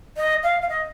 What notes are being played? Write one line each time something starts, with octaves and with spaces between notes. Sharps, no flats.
D#5
F5
F5
D#5